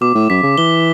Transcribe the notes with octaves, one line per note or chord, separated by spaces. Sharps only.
B2 D6
A2
F#2 B6
C#3
E3 G7